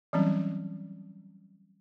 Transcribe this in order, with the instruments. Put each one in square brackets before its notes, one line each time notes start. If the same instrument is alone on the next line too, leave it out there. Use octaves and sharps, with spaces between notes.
[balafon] E3 F#3 G3 C4 C#4